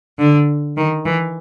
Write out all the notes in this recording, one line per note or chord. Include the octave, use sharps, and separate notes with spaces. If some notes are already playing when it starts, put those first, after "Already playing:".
D3
D#3
E3